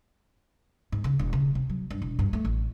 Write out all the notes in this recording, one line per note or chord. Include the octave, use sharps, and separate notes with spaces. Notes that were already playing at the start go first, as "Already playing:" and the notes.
G#2
C#3
E1
C#3
C3
F#3
G2
E1
G2
A3
A1